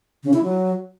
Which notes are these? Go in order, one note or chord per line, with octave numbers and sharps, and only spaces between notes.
C#3
E4
F#3